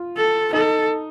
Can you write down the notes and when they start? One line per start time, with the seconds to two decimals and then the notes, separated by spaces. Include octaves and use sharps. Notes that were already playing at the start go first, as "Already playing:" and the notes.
Already playing: F4
0.17 A4
0.53 D#4 A4